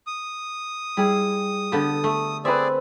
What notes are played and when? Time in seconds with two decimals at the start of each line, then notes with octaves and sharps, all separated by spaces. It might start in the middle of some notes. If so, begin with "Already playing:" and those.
0.07 D#6
0.97 G3 E4 G#4
1.72 D3 B3 G4 A4
2.04 A3
2.45 C4 G#4 B4 D5 E5